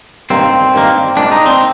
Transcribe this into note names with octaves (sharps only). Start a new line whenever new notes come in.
G2 D#3 A#3 C4
G2 D#3 A#3
A#2 G#3 C4 D4
D#4
C4